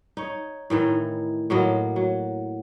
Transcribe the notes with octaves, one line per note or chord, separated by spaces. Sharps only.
D#4 C#5
A2 D#3 E3 D#4
A2 F#3 A#3 D#5
F#3